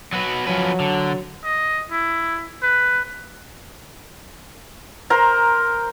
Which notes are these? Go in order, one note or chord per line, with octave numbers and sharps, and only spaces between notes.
F#3 F#4 B4
F3 F#3 C#4 B4
D3
D#5
E4
B4
A#4 C5 A#5